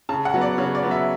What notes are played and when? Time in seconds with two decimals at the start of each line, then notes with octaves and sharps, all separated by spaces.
0.09 C#3 A5
0.25 F#5
0.34 F#3 B3
0.42 D5
0.58 C#3 C#5
0.75 D5
0.83 F#3 B3
0.91 E5